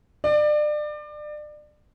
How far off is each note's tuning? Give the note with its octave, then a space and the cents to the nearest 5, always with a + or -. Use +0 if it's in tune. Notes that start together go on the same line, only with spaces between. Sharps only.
D5 +30